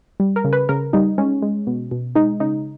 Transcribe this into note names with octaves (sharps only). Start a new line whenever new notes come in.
G3
A#4
C#3
B4
C#3 A#4
G3 D#4
G#3 C#4
G#3
B2
B2
G#3 D#4
C#3 D#4